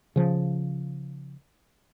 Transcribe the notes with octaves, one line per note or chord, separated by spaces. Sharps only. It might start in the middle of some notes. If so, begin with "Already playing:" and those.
C#3 F3